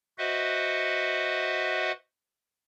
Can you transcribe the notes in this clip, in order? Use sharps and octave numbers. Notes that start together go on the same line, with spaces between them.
F#4 B4 C5 D#5 E5 F#5